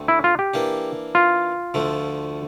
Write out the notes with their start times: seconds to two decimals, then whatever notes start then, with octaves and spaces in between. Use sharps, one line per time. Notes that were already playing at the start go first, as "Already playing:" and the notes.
Already playing: D2 D3 A3 C4
0.08 E4
0.24 F4
0.39 G4
0.54 E3 A#3 D4
1.15 F4
1.74 D2 D3 F3 A3